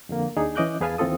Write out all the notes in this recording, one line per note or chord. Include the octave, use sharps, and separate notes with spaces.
F2 D3 A#3
D#2 D4 D#4 G#4
E3 C#4 D#5 D6 F#6 G6
E2 G#4 B4 F5 G#5 A5
D#2 E3 C4 F4 A4 D#6